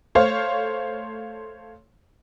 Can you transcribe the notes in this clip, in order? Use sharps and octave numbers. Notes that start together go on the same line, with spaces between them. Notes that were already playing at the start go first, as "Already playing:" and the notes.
A3 C5 C#5 F5